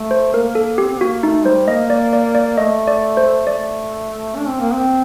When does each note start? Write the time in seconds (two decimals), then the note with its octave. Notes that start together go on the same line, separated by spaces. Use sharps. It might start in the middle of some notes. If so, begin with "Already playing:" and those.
Already playing: A3
0.11 C5
0.33 A#3 A#4
0.55 A4
0.78 C4 G4
0.90 C4
1.00 A#3 F#4
1.23 A3 D#4
1.45 G3 C5
1.68 A#3 D#5
1.90 D5
2.13 D5
2.35 D5
2.58 A3 D#5
2.87 D5
3.17 C5
3.47 A3 D5
4.36 D4
4.48 C4
4.60 A#3
4.72 C4